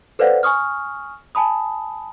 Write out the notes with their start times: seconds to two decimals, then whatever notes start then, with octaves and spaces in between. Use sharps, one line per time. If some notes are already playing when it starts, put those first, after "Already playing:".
0.19 A4 B4 C5 D5 F5 F#5
0.43 G#5 C#6 D#6 F6
1.35 G#5 A5 B5 D#6